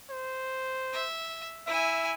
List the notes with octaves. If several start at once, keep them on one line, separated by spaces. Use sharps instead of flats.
C5
E5
E4 E5 G#5